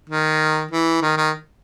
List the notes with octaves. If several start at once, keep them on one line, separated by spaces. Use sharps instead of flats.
D#3
E3
D#3
D#3